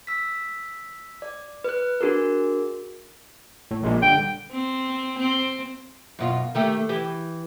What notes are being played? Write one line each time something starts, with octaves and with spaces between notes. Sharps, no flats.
E6 B6
D5
B4 F#6
D4 F#4 G#4 A#4
A2
A#1 A#2 G#3
D3 G3 G5
C4
C4
F#2 B2 F4
D#3 A3 G4
E3 G4